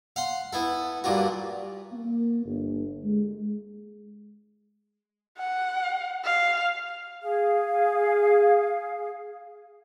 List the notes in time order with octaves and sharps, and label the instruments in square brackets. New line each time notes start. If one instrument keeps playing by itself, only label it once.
[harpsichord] F5 F#5 C6
B3 E4 A4
G2 A#2 D4 F4 F#4
[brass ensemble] A#3
G1
G#3
[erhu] F#5
F5
[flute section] G#4 F5